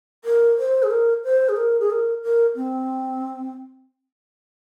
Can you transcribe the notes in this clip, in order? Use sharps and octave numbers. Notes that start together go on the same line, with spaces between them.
A#4
C5
G#4
A#4
C5
G#4
A#4
G#4
A#4
A#4
C4